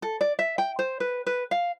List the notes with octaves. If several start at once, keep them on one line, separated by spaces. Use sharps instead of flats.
A4
D5
E5
G5
C5
B4
B4
F5